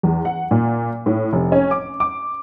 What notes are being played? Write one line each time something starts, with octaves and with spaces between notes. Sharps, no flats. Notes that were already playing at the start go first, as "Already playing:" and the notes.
E2
F#5
A#2
A2
F1
C#4
D6
D6